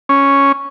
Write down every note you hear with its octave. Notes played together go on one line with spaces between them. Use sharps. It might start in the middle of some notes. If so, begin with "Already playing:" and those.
C#4